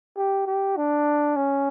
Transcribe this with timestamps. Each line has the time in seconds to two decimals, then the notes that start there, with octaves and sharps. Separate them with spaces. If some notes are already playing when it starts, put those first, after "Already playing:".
0.17 G4
0.47 G4
0.77 D4
1.36 C#4